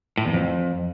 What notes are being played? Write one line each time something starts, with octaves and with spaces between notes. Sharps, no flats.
A2
E2
F2